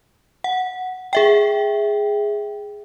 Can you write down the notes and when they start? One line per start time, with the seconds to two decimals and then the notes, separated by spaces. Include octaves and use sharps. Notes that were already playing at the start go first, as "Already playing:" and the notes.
0.44 F#5
1.13 G#4 E5 G5